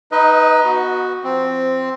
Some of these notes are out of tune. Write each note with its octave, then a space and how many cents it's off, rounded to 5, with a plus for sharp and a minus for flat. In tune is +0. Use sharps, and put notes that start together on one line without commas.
D#4 +0 B4 +0 D#5 +30
B3 -25 F#4 +0
F3 -15 C4 +0